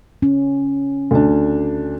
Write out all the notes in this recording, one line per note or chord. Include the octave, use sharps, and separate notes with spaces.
C#4
D2 D4